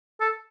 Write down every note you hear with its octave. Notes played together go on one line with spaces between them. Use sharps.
A4